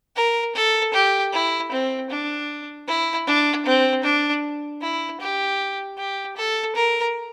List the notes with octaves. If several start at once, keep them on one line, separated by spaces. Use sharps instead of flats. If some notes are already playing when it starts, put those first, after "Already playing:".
A#4
A4
G4
E4
C4
D4
E4
D4
C4
D4
E4
G4
G4
A4
A#4